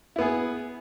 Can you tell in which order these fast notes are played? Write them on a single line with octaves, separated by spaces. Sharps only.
E4 B3 G#4